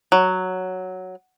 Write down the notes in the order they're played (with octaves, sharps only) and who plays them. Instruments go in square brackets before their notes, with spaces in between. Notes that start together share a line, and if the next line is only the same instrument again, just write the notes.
[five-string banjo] F#3